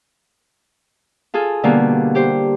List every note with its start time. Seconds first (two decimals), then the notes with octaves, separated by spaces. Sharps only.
1.34 F4 G#4 A4
1.63 B2 D3 G3 A#3
2.15 G4 C5